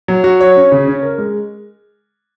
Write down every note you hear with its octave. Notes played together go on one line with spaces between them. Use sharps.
F#3
F#4
C#5
C#4
C#3
C#4
A#4
G#3